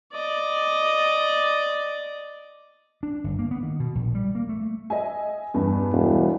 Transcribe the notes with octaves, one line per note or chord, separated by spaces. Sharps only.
D5 D#5
D4
G1
A#3
B3
D#3
B2
A#1
G3
A#3
A3
D#5 E5 G#5
E2 G2
E1